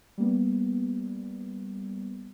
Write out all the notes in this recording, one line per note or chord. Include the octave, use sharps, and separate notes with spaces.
G3 A#3 B3